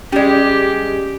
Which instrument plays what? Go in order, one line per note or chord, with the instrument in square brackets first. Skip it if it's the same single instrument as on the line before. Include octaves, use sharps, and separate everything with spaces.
[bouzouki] G3 G#3 [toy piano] C#4 D5 [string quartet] G4